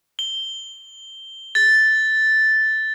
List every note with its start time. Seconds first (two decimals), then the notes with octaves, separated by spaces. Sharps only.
0.19 G7
1.55 A6